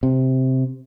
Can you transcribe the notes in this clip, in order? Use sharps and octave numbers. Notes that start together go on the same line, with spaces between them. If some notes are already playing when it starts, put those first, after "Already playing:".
C3